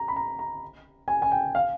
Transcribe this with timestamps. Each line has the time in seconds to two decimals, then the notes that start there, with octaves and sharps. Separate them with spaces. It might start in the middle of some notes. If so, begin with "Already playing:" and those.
Already playing: A#5
0.08 B5
0.16 A#5
0.39 A#5
1.08 G#5
1.22 G#5
1.31 G5
1.55 F5